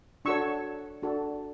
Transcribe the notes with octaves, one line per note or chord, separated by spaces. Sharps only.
D4 F#4 A4 C#5 C#6 E6
D4 F#4 A4